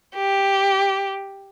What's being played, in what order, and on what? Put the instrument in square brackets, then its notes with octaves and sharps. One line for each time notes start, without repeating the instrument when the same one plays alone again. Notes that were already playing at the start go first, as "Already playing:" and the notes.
[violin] G4